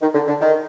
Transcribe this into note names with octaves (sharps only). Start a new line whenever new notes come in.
D#3
D3
D3
D#3